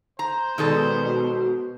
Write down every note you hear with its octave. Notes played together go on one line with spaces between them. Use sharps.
C5 A#5
B2 D#3 G#3 A4 D5
F#4